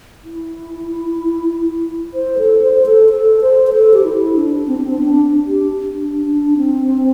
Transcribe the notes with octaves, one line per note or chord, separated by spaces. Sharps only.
E4
C5
A4
C5
A4
A4
C5
C5
A4
G4
E4
D4
C4
D4
C4
D4
G4
D4
D4
C4